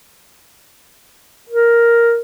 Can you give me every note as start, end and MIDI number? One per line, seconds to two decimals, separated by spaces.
1.49 2.21 70